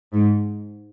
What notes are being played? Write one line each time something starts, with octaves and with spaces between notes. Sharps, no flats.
G#2